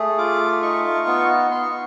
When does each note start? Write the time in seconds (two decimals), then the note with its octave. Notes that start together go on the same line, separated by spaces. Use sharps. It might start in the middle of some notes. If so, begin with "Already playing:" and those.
Already playing: A3 G#4
0.18 F4 D6
0.62 D#4 C#6
1.07 B3
1.51 B3 C6
1.62 C#6